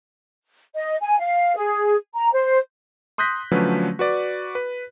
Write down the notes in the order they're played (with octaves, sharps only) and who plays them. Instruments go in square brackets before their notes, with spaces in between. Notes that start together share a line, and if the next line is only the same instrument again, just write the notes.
[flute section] D#5
G#5
F5
G#4
A#5
C5
[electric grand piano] C6 D#6 F#6 G6 A#6 B6
D3 F3 F#3 A3 C#4 B4
F#4 B4 D5
B4